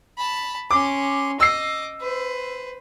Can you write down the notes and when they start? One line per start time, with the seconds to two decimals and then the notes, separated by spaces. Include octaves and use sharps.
0.18 A5 B5
0.71 C#4 C6 D6
1.40 D#5 D6 E6 C7
2.01 B4 C5